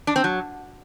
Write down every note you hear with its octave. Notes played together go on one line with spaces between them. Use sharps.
D4
C4
F#3